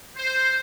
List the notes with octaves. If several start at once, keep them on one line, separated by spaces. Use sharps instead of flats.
C5